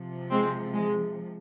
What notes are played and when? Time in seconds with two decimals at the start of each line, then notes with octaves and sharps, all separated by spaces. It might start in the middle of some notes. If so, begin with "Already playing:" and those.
Already playing: C3 F3
0.31 G#3 C4
0.74 G#3